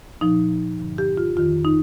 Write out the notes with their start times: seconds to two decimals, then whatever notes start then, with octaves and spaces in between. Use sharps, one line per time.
0.21 A#2 F3 D#4
0.79 G2 D3 F3
0.98 G4
1.17 F4
1.36 F2 D#3 F4
1.65 D#4